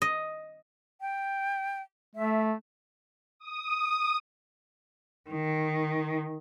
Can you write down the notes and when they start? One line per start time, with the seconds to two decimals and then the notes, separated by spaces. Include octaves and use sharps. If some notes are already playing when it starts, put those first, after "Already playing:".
0.02 D#5
1.01 G5
2.15 A3 E5
3.39 D#6
5.30 D#3